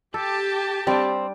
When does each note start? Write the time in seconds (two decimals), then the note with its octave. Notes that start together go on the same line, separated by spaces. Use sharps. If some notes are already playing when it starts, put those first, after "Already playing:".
0.14 G4 A4 A5
0.87 G3 C4 D4